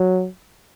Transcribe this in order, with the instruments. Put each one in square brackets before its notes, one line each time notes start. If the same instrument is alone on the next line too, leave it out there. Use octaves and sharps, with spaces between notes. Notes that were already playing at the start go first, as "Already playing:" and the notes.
Already playing: [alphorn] F#3